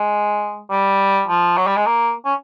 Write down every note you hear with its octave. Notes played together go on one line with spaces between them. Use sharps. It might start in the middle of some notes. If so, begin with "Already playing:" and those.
Already playing: G#3
G3
F3
F#3
G3
G#3
A#3
C#4